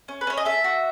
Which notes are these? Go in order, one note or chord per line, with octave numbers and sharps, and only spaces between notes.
C#4
B4
C#4 C#5
D#5
A4 E5
F#4